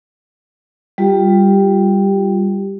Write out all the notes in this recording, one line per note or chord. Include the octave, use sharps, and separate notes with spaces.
G3 F4 G4